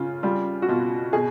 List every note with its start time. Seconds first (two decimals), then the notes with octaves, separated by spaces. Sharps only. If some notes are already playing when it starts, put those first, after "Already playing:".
Already playing: C#3 F4
0.23 G3 F4
0.62 F#4
0.68 B2 F4
1.13 B2 G#4